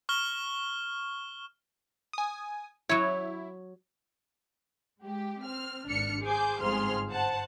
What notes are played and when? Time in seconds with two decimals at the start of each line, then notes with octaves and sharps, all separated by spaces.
0.09 C#6 F6 G7
2.13 G#5 D#6
2.89 F#3 E4 C#5
5.02 G#3 G4
5.43 C4 F6
5.88 G#1 D4 F6 C#7
6.24 G#4 C5 G#5 D6 G6
6.61 G1 F2 G#2 G#4 C6 F6
7.10 C5 F#5 A5